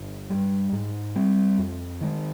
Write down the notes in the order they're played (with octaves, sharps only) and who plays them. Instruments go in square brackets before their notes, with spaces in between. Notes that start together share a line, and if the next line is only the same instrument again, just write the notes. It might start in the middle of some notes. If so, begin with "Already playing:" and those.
Already playing: [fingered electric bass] G1
G2 G3
G#2
G3 C4
F2
D#3 G#3